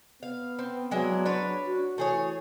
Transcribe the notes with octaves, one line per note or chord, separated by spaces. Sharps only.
B3 F5
C4
F#3 G#3 D4 E4
D4 B4 C#5
F#4
E3 A3 G#4 C#5